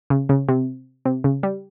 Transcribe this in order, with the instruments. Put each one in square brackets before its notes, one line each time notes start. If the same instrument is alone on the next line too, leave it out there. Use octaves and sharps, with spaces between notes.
[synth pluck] C#3
C#3
C3
C3
C#3
G3